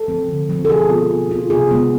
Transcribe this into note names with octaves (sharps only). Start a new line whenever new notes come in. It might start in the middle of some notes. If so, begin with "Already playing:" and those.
Already playing: A4
F3 A3 C4
D3
F3 A3 C4
A4
B2 G#4
B3 F4
B2
B3 F4
C3 G#4
G#3 B3